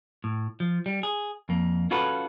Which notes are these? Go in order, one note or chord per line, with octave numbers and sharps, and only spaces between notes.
A2
F3
G3
G#4
F2 A#3
C#4 F4 F#4 A4 B4